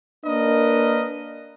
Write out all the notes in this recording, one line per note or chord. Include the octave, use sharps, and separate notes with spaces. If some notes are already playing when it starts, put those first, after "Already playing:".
A#3 D4 A#4 B4 D#5